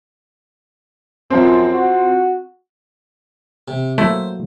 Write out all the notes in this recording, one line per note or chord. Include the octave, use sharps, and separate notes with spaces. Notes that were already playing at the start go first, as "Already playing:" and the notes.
F#2 F3 C4
F#4
C3
F#3 A3 A#3 E4 C5